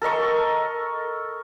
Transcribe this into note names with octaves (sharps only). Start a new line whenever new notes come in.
A4 A#4 D#5 C#6